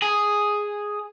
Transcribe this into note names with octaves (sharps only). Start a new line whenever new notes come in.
G#4